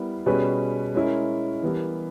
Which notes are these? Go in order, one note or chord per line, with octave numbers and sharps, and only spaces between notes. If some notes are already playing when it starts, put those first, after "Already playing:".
Already playing: G3 B3 E4 A#4
B2 G3 C#4 G#4 B4
G#3 C#4 E4 A#4
E3 G3 B3 G4 A#4